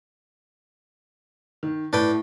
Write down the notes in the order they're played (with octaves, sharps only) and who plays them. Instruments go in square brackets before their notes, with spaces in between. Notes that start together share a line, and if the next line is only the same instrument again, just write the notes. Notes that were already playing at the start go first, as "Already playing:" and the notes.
[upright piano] D#3
[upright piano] A2 [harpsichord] D4 B4 G5